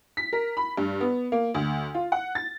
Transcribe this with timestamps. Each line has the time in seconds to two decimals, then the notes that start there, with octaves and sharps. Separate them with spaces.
0.17 B6
0.33 A#4
0.57 B5
0.77 G2
1.01 B3
1.32 A#3
1.54 D2
1.95 F4
2.12 F#5
2.35 A6